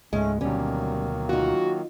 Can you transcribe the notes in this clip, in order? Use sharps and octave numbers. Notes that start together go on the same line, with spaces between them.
C#2 G#2 G#3 A3 C#4
D2 B2 D#3 F#3 G3 A#3 C#4
D#4 F4 F#4